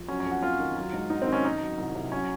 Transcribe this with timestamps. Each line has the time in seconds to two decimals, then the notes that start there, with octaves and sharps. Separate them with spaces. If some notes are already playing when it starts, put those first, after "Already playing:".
Already playing: F3
0.08 F#3 C#4
0.20 C#4
0.25 F2
0.31 F#4
0.42 F2 F4
0.59 D#3
0.76 F#3
0.93 G#2
1.10 G#2 D#4
1.22 C4
1.27 D#3
1.32 C#4
1.44 D#3 D#4
1.61 F#3
1.78 C2
1.95 C3
2.12 F#3 C#4